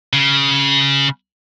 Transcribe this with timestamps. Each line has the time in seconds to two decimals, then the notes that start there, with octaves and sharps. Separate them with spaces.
0.13 C#3